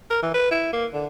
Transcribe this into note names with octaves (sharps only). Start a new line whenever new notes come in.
A#4
E3
B4
E4
A#3
D3